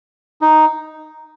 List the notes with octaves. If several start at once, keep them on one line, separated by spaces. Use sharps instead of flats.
D#4